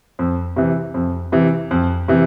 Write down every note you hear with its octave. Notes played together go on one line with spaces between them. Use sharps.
F2
C3 E3
F2
C3 E3
F2
C3 E3